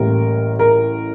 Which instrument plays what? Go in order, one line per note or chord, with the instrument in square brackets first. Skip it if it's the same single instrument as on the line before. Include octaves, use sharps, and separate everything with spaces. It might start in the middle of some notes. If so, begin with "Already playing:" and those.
Already playing: [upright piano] A1 A2 G3 A#3 A#4
A#4